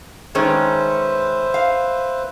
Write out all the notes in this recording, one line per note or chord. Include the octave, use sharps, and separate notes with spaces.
D#3 G#3 C#4 B4 C5 E5
F5